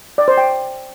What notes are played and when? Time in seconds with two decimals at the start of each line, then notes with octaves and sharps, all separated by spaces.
0.18 D5
0.28 C5
0.37 G5